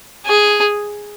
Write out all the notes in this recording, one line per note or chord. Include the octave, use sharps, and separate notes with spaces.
G#4